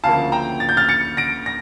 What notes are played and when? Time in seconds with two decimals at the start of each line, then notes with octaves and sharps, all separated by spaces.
0.04 D2 C#3 F3 A#3 F5 A5
0.32 G5 A#5
0.60 A6
0.69 G6
0.77 F6 A6
0.89 A6 C#7
1.17 A#6 D7
1.46 A#6